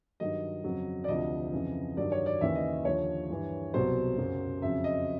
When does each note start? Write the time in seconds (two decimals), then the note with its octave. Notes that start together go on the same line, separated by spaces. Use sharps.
0.20 G2 D#3 F#3 D#5
0.64 F2 C#3 F#3
1.04 D5
1.08 D2 C3 F3 D#5
1.53 F2 C#3 E3
1.97 G2 D#3 F#3 D5
2.12 C#5
2.26 D5
2.41 D#2 C#3 E3 E5
2.55 D#5
2.85 D#2 D3 F3 C#5
3.30 G2 E3
3.74 C2 B2 F#3 C5
4.18 F#2 C#3 F#3
4.62 F2 C#3 F#3 E5
4.84 D#5